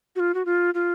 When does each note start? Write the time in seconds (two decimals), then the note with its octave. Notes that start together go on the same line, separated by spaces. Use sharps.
0.16 F#4
0.20 F4
0.34 F#4
0.45 F4
0.74 F4